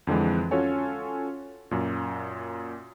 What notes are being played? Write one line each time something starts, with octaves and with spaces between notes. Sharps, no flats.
F2 D3 E3 G#3
C#4 F4 F#4 A4 C#5 G#5
F#2 A#2